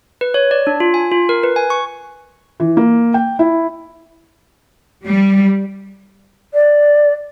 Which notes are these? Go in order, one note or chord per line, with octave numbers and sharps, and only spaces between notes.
B4
C#5
D5
D4
F4
G#5
F4
A#4
B4
G#5
C#6
E3
A#3
G5
E4
G3
D5